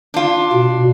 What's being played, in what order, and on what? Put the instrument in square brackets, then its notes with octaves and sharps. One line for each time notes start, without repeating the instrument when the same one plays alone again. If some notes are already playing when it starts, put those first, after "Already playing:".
[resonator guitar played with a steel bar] D4 F4
[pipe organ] B2